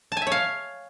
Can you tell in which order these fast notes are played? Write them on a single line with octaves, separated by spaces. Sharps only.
A5 G#5 E5 C#5 F5